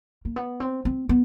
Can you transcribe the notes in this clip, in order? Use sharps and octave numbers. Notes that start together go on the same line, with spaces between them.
A#3
B3
C4
C4
B3